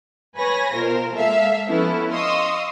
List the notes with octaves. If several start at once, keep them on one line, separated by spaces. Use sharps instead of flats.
B4 C#5 G#5 B5 A#6
B2 F4 A#4 C5
G#3 A#3 A4 E5 F5
F3 B3 C#4 E4 A4
D#5 F5 C6 C#6 D#6 E6